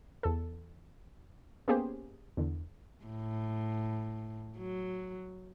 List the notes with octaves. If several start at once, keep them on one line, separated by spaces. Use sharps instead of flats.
E2 A4
A#3 B3 C#4 G4 G#4 C5
E2 D3
A2
F#3